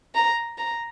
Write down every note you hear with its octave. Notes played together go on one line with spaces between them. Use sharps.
A#5
A#5